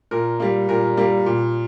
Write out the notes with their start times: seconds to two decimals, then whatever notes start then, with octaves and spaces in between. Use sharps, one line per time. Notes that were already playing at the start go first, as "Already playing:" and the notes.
0.11 A#2 A#4
0.40 G3 A#3
0.69 A#2 A#4
0.97 G3 A#3
1.26 A#2